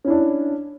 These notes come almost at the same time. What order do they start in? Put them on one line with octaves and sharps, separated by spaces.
C#4 E4 D4